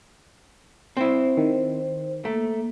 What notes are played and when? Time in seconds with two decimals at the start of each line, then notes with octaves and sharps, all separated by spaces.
0.97 C4 E4 C5
1.37 D#3
2.25 A3 A#3